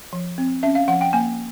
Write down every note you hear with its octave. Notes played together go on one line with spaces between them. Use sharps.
F3
C4
C#4 E5
F5
F3 F#5
G5
A#3 G#5